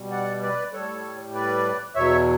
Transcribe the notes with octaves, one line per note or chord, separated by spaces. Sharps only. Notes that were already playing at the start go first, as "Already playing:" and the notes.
Already playing: B2 G3
D5 F#5
B4 D5
A2 G3 A4 C#5
B4 D5
E2 B2 F#3 C#5 E5